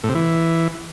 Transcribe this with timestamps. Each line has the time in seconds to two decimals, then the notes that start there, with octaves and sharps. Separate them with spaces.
0.03 A2
0.09 C3
0.15 E3